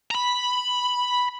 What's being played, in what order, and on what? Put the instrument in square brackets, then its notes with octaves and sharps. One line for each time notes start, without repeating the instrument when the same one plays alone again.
[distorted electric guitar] A#5 B5